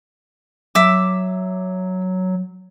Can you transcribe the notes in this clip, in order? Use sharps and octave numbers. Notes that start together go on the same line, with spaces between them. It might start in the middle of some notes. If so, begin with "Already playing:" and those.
F#3 E5 D6